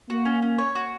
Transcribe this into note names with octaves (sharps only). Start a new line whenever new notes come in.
A#3 F#4
C#4
C#4
C#5
F#4